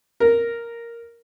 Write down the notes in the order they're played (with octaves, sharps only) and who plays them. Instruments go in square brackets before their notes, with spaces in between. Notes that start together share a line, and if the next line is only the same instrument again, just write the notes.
[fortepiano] A#4